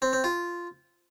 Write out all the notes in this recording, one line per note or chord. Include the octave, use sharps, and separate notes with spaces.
C4
C4
F4